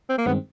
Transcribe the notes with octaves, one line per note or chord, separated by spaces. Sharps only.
C4
A#3
G2 D#3 G#3 B3 C4